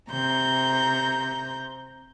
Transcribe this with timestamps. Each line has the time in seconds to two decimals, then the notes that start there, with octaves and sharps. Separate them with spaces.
0.10 C3 A#5 G6